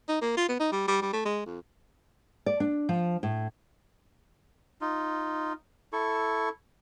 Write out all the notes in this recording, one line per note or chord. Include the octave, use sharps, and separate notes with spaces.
D#4
A#3
F4
B3
D#4
G3
G3
G3
A3
G#3
F2
D5
D4
F3
A2
D#4 F4
E4 A4 C#6